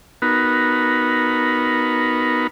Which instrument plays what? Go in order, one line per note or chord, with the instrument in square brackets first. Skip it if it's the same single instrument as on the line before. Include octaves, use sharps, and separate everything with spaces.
[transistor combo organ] B3 D#4 F#4 A#4 B4